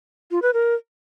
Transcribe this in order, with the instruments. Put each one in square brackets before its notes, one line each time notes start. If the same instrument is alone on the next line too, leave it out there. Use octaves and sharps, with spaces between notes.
[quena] F4
B4
A#4